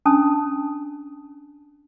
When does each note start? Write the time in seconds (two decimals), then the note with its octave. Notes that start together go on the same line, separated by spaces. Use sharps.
0.06 C#4 D4 A5 D#6